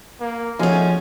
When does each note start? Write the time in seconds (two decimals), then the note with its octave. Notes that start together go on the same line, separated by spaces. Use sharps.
0.20 A#3
0.59 F3 A3 C#4 D#4 F#4 G#4 G#5